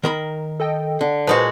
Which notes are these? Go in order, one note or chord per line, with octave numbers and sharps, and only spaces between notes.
D#3 A#4 B5
A4 D#5 G5
D3
A#2 G#3 F#4 B4 C5 A5